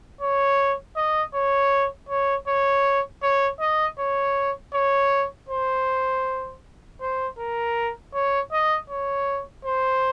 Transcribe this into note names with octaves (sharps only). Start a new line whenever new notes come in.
C#5
D#5
C#5
C#5
C#5
C#5
D#5
C#5
C#5
C5
C5
A#4
C#5
D#5
C#5
C5